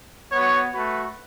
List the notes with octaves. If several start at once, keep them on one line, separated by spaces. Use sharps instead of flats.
B3 F#4 C#5
A3 F#4 B4